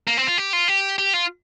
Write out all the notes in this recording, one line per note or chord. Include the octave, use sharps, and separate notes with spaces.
A#3
C4
F4
G4
F4
G4
G4
F4